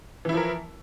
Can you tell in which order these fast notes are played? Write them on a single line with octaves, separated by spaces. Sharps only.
E3 E4 F3 A#4